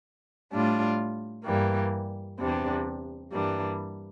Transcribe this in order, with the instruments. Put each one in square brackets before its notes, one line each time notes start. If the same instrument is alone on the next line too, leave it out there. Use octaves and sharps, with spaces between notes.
[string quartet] A2 G3 D4 F4
G2 E3 G3 A#3
E2 C3 G3 D4
G2 E3 G3 A#3 D4